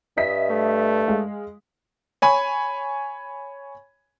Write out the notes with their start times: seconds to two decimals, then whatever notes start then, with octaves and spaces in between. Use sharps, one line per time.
0.17 G2 D#5 E5 B6
0.50 A3
1.08 G#3 F5
2.22 C#5 G#5 B5